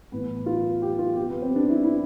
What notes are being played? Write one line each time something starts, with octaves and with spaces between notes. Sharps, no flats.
A2 E3 B3
F4
G4
F4
B2 G4
B3
C4
D4
E4
E4